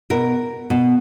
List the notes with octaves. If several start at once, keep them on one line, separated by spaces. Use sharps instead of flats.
B2 A#4
B2